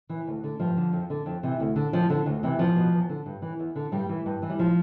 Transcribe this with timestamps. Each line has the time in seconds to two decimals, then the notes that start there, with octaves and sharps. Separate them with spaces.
0.09 E3
0.27 D2
0.44 D3
0.60 G2 F3
0.77 D3
0.93 F2
1.10 D3
1.26 F2
1.43 C3 E3
1.60 D2
1.76 D3
1.93 F2 F3
2.10 D3
2.26 D2
2.43 C3 E3
2.59 E2 F3
2.76 B2
2.93 E2
3.09 D3
3.26 G2
3.42 E3
3.59 E2
3.76 D3
3.92 G2 G3
4.09 E3
4.26 G2
4.42 E3
4.50 G3
4.59 F3